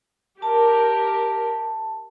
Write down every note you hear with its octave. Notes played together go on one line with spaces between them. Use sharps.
G4 A#4 A5